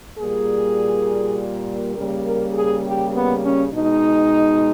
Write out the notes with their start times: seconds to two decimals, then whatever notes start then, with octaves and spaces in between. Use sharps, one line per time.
0.18 A#2 G3 A#3 G#4
1.95 C#3 G3 A#3 A#4
2.25 A#4
2.54 G#4
2.85 G4
3.14 B3
3.43 C#4
3.72 B2 G#3 D#4